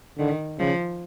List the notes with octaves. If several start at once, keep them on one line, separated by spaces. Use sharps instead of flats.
D3 D#3
C#3 F3